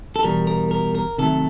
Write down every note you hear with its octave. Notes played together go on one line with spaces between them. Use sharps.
A4
E2 B2 G3 A#4
A#4
A#4
A#4
C3 D#3 F#3 A3 A4